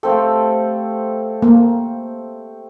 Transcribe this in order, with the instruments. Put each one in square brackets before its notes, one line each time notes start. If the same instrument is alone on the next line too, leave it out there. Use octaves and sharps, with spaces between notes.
[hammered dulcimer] A3 C4 G4 [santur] A4 C5 F5
[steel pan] A#3